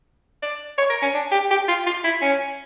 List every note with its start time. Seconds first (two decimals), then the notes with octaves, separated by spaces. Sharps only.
0.42 D5
0.78 C#5
0.90 A#4
1.02 C#4
1.14 D4
1.32 G4
1.50 G4
1.68 F4
1.86 F4
2.04 E4
2.22 C#4